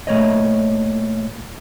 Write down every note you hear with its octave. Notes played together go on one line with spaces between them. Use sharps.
A#2 A3 C#5 D#5